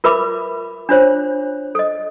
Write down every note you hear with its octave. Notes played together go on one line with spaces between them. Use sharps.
F4 A#4 B4 E5 B5 D6
D4 F4 C5 C#5
A4 D#5